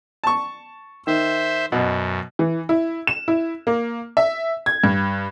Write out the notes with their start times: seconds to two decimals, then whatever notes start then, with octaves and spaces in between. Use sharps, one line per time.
0.24 A5 C#6
1.07 D#3 C5 E5
1.72 F#2 B2
2.39 E3
2.69 E4
3.07 E7
3.28 E4
3.67 A#3
4.17 E5
4.66 G#6
4.84 G2